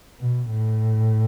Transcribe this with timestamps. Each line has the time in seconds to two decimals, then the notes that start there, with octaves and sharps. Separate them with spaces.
0.20 B2
0.49 A2